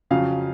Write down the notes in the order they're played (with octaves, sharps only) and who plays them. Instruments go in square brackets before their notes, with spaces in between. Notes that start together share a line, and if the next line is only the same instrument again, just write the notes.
[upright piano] F2 C#3 F#3 C#4 F5